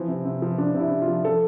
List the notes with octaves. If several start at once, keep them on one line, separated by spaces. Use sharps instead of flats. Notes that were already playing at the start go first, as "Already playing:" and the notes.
Already playing: E3 F3 C4
C3
C3
F3
F3 D4
C3
E4
C3
F4
F3
F3 A4